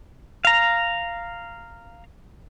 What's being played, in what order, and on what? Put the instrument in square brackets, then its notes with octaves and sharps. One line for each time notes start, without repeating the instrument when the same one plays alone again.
[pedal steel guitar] F5 A#5